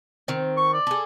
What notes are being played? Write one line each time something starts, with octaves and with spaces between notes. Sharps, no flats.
D#3 C4
C#6
D5
G#4 A4